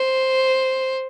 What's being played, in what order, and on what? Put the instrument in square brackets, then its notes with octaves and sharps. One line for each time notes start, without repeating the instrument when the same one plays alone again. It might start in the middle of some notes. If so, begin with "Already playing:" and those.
Already playing: [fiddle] C5